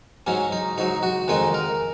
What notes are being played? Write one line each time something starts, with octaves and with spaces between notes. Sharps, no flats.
G#2 F#3 C#4
D#4
G#2 F#3 D#4
F#4
F2 D#3 G#3 D#4
A#4